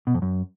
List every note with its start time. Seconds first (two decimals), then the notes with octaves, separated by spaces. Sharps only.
0.07 B2
0.14 F2
0.22 F#2